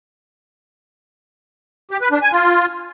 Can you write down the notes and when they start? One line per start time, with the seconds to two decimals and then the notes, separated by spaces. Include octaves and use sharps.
1.91 G4
2.01 B4
2.12 D4
2.22 G#5
2.32 F4